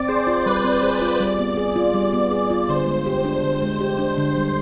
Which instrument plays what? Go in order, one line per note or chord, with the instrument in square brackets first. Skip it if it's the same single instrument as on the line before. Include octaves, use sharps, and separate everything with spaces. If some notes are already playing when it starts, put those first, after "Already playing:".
Already playing: [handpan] C4 [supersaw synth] D5
[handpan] G#4 [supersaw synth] C5
[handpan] F4
[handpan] G3 [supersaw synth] B4
[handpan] C4
G#4
F4
[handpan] G3 [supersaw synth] D5
[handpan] B3
G#4
F4
[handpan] G3 [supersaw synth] D5
[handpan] B3
G#4
F4
[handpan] D3 [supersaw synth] C5
[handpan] G#3
G4
D4
D3
G#3
G4
D4
D3
G3